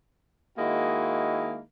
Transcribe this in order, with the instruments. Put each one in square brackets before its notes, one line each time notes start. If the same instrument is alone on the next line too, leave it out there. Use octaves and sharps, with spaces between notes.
[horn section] D#3 G#3 A#3 E4 F#4